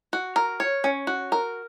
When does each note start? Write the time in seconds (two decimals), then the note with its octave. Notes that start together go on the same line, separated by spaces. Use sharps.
0.13 F#4
0.36 A#4
0.60 C#5
0.84 C#4
1.07 F#4
1.32 A#4